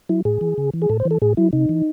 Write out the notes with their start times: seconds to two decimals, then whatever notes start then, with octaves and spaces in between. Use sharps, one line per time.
0.09 F#3 E4
0.25 A2 G#4
0.41 E3
0.58 C#3
0.74 E3
0.82 G#4
0.89 A2 A4
1.00 C5
1.05 E3
1.11 A4
1.22 A2 G#4
1.37 F#3 E4
1.53 C3 D#4
1.69 E3